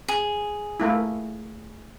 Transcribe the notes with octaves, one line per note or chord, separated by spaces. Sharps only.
G#4
A3 A#3 E4